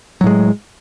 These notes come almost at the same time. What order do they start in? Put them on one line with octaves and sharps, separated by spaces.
F#3 A2 G#3